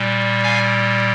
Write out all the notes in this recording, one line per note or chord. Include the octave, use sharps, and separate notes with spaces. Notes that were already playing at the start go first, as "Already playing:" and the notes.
Already playing: A#2 G3
F5 G#5